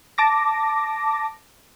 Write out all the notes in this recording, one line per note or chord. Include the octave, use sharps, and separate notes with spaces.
A5 D6 A#6